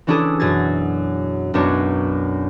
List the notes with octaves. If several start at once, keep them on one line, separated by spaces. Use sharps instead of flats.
E3 C#4 D4 E4 G#4 A4
F#2 B2 G#4 G#6 A6
B1 F#2 B3 D4 C#5